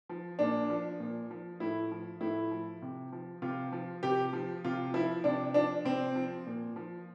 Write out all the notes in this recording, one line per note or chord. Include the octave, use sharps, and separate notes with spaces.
F3
A#2 D4
F3
A#2
F3
A2 E4
F3
A2 E4
F3
C3
F3
C3 F4
F3
C3 G4
F3
C3 F4
F3 E4
C3 D4
F3 D4
C3 C4
F3
A#2
F3